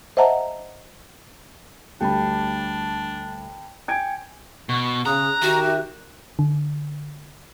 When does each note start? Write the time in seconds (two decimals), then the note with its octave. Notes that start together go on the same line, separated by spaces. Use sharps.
0.17 C5 D#5 E5 F#5 A5 A#5
2.01 D2 G3 D4 G5 A5 B5
3.88 G5 G#5 G6 G#6 D7
4.69 B2 C#6
5.06 C#3 A#5 D#6 F#6
5.42 D#3 F#4 G4 E5
6.39 D3